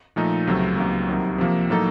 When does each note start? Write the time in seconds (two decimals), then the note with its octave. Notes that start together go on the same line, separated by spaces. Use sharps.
0.16 A#2 F3 A3 D#4
0.47 C#2 C3 F#3 A3
0.77 C#2 C3 D#3 F#3 A#3
1.09 C2 C3 D#3 F#3
1.38 C3 F3 A#3
1.70 A2 F#3 A#3 D#4 A4